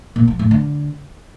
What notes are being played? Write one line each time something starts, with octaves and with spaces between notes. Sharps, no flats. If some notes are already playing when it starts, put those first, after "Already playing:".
A#2
F3
A2
D3